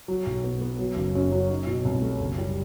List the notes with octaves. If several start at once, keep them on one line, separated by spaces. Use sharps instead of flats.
F#3
B1
B3
B3
F#3
F#1
F#2
F#3
D#4
B2
C2
A3
F#1
G3